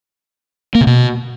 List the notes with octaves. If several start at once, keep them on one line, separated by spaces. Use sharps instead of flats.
A#3
C3
B2